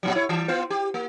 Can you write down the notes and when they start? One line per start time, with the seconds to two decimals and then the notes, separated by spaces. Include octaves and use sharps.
0.03 A#2 D3 F#3
0.15 E4 C#5
0.29 E3 G3
0.48 B3 F4 C5
0.70 G4
0.94 A#3